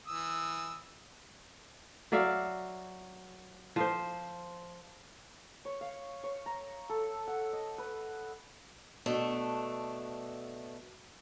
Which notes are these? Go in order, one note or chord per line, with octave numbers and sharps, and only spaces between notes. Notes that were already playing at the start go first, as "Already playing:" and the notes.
E3 D#6 E6
F#3 D5 E5 F5
F3 C5
C#5
F5
C#5
A#5
A4
F#5
D#5
B4
B2 A3 D4